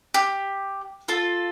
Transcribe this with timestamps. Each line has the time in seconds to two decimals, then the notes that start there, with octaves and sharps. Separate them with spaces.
0.14 G4
1.08 F4 A4